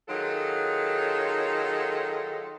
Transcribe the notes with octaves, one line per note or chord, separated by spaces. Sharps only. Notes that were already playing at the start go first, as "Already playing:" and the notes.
D#3 F#3 F4 G#4 A4